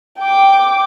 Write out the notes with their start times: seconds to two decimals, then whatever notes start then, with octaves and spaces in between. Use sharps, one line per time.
0.19 G5 D6